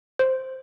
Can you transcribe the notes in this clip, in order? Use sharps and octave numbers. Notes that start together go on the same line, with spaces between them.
C5